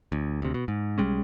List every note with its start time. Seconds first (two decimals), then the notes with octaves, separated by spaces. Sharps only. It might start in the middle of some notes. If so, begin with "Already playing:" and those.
0.12 D2
0.42 D2 C3
0.54 B2
0.68 G#2
0.98 B1 G3 G#3 C#4